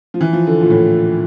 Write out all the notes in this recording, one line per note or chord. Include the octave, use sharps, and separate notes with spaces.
F3
E3
F3
D3
A#2
A2